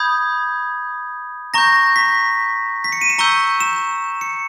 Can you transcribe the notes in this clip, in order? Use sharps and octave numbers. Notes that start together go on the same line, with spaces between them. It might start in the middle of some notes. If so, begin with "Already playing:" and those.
Already playing: B5 D#6 G6 G#6
A#5 C#6 G6 A#6
B6
B6
C#7
D#7
E7
A#5 C#6 E6 G6 G7
E7
C#7